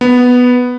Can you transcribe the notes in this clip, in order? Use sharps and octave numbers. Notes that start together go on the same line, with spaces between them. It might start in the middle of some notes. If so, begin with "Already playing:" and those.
B3